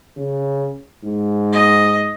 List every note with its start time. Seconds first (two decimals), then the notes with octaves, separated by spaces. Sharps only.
0.17 C#3
1.04 G#2
1.52 D#5